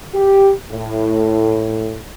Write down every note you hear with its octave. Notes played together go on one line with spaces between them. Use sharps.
G4
A2